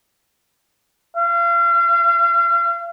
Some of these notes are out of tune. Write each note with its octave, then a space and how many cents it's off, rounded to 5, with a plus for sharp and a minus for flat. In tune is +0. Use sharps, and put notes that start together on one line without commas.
F5 -35